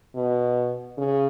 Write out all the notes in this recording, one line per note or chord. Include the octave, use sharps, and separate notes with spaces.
B2
C#3